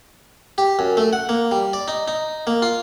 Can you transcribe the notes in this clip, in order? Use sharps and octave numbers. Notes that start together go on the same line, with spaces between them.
G4
F#2
A3
F#5
A#3
G3
D5
D#4
D#4
A#3
F4